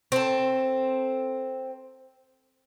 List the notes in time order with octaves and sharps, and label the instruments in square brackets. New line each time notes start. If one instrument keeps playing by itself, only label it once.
[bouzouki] C4 A4